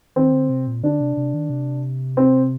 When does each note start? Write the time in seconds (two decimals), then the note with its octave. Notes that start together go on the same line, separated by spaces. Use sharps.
0.16 D#3 C4
0.33 D3
0.50 C3
0.67 A#2
0.83 D3 D4
1.01 C3
1.17 C3
1.34 D#3
1.50 C3
2.17 C4